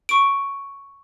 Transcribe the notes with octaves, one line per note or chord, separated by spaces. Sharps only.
C#6 D7